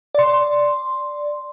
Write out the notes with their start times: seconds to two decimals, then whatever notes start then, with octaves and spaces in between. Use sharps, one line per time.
0.15 D5 C6